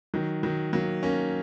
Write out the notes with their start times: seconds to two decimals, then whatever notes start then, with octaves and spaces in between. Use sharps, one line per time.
0.14 D#3 F#3
0.43 D#3 F#3
0.73 F#3 A#3
1.03 A#3 C#4